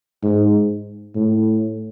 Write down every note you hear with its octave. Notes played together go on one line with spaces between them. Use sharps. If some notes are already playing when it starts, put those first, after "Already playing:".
G#2
A2